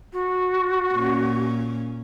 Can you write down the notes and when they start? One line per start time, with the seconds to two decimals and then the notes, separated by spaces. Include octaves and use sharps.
0.13 F#4
0.94 A#2 C#4